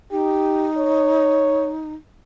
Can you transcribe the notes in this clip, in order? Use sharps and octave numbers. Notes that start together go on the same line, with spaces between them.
D#4 G4
C#5